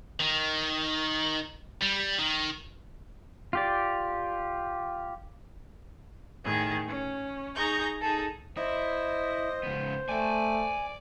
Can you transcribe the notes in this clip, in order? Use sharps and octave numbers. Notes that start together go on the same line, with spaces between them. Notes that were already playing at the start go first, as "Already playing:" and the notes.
D#3
G3
D#3
F4 G4 D5
A2 D#3 G#4
C#4
D#4 G#4 A#5 C#6 G6
D#4 G#4 A4
E4 C5 D#5
C#2 B3
A3 D5 G5 G#5